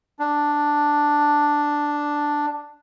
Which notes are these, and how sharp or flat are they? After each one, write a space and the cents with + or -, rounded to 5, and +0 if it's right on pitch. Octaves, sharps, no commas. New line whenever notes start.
D4 +0